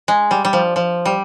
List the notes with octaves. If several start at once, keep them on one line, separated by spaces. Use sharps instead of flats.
G#3
G3
G3
F3
F3
G3